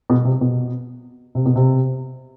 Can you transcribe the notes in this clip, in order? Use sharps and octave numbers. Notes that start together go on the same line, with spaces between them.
B2
C3
B2
C3
B2
C3